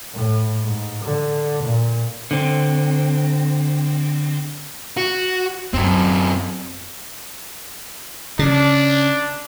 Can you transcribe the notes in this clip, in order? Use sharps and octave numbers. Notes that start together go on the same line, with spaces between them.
A2
G#2
D3
A#2
D3 C4
F#4
F#2 F#3 C4
C#3 D4